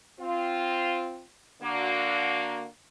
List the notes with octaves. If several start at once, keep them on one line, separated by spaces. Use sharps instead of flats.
C4 F4
D3 A#3 F#4